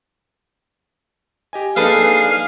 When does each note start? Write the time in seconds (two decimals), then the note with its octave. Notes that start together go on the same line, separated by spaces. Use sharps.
1.53 G4 D#5 G#5
1.76 A#3 D4 D#4 G#4 A4 B4 E5 F5